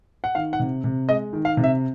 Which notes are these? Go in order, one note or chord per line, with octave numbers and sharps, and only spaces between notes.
F#5
D#3 F5
F#5
C3
C3
G#3 D#5
D#3
F5
C3
E5